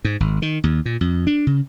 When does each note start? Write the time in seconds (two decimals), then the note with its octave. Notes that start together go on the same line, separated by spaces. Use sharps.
0.05 G#2
0.20 G#1
0.42 D#3
0.64 D#2
0.86 A#2
1.01 F2
1.27 D4
1.47 C#3